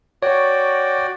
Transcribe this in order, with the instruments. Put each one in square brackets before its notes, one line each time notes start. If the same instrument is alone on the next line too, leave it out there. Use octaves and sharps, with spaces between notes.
[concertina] F#4 D5 G5 [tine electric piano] C#5